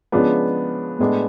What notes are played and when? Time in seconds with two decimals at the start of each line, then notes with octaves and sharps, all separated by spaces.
0.12 C#3 F3 G#3 B3 D4
0.99 A2 G#3 B3 D4